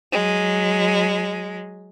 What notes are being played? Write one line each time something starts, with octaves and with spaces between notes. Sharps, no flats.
F#3 G#3